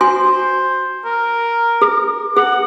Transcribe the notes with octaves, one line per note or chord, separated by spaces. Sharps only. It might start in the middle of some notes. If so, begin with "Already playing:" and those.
F#4 C5 G#5 C6
A#4
G#4
G#4 F#5